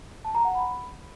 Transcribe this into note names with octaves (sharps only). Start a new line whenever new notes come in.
A5
A#5
F#5
B5